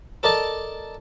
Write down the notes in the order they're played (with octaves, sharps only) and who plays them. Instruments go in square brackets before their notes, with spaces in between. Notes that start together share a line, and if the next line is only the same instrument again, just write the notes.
[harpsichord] A4 A#4 D5 D#5 A5